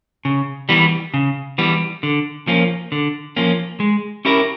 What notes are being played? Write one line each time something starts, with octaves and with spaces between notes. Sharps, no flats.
C#3
E3 G3 B3
C#3
E3 G3 B3
D3
F3 A#3 C#4
D3
F3 A#3 C#4
G#3
C#4 E4 G4 A#4